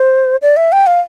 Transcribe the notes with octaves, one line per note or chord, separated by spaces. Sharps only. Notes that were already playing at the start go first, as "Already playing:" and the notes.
Already playing: C5
D5
E5
G5
F5